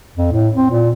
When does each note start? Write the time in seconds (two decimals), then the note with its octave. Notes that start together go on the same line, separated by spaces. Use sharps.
0.17 F2
0.32 A2
0.55 C4
0.71 A#2